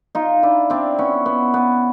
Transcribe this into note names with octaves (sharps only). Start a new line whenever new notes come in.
D#4 F4
D4 E4
C4 D4
B3 C#4
B3
B3